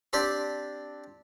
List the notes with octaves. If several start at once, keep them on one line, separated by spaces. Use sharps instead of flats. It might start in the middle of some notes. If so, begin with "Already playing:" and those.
C4 D4 G4 D5